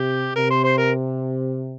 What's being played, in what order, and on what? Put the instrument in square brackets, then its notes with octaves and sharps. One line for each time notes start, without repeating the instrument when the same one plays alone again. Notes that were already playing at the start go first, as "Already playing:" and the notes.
Already playing: [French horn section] C3 [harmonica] G4
[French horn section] C3 [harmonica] A#4
[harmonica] C5
C5
A#4